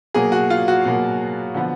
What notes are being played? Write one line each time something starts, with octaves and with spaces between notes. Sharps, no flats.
B2 F#3 A#3 G#4
F#4
F4
F#4
B2 F#3 A#3
D3 F3 B3